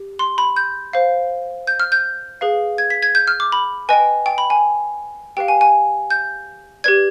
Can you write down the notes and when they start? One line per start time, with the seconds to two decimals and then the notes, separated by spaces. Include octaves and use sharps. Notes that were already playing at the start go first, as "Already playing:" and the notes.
Already playing: G4
0.19 C6
0.38 B5
0.56 G6
0.93 C5 F5
1.67 G6
1.80 F6
1.92 G6
2.41 G#4 B4 F5
2.78 G#6
2.90 B6
3.03 G#6
3.15 G6
3.27 F6
3.40 D6
3.52 B5
3.89 B4 D#5 G5 G#5
4.26 G5
4.38 B5
4.50 G#5
5.37 G4 B4 F5 G5
5.48 G#5
5.61 G#5
6.10 G6
6.84 G4 B4 D5 G#6